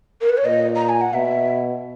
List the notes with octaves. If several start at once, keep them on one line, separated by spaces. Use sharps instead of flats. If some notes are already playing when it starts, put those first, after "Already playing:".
A#4
B4
C#5
A#2 D#5
A#5
G#5
F#5
B2 E5